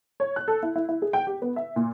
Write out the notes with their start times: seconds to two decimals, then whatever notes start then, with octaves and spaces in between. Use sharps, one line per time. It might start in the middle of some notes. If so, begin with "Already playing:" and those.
0.20 C#5
0.36 F#6
0.48 A4
0.63 E4
0.76 E4
0.89 E4
1.02 G#4
1.13 G5
1.27 G4
1.42 B3
1.56 E5
1.76 A#2